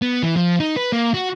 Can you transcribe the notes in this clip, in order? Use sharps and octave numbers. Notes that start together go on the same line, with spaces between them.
B3
E3
F3
D#4
B4
A#3
F#4